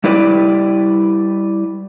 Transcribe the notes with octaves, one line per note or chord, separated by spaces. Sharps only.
G3 E4 G4 B4 D5